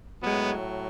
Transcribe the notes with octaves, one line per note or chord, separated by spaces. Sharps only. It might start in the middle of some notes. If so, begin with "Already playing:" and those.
A2 F#3 G#3 B3